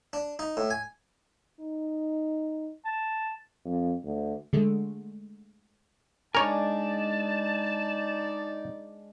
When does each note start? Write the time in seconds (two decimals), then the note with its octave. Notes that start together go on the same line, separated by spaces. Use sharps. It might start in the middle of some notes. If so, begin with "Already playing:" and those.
0.13 D4
0.39 D#4
0.57 A2
0.71 G#5
1.60 D#4
2.85 A5
3.65 F2
4.04 D2
4.53 D3 G#3 A3
6.35 G#3 D4 D#4 A#4 C#5 D5 G#5 A5